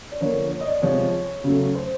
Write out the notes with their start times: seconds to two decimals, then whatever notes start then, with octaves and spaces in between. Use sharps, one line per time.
0.11 D5
0.21 D3 F3 A#3 C#5
0.52 C#5
0.60 D#5
0.67 D5
0.82 C3 F3 G#3 C#5
1.44 C#3 F#3 A3
1.75 C5